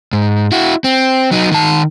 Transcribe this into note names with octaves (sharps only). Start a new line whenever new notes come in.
G#2
E4 F#4
C4
F#3 D#4
D#3 A5